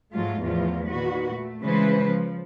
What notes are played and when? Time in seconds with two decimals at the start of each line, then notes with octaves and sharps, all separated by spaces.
0.12 G#2 F#3 A3 F4
0.42 E2 A2 F3 F4
0.87 A#2 D#3 F#4 B4
1.33 A3
1.62 C#3 E3 G#3 B4 C5
2.04 F3